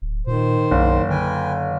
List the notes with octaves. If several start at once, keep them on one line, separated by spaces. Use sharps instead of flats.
D1
A#2 D#3 C5
F#1 B1
D3 B4 G5 G#5